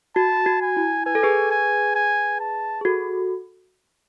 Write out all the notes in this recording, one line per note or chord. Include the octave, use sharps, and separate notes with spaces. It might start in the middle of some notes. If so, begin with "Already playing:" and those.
F#4 A5
F#4
G#5
E4
B4 G#5
A4
G#4 B4
G#5
G#5
A5
G#4
F#4 A4